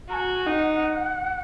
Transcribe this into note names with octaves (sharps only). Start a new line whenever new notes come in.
F#4 G#5 A#5
D#4 F#5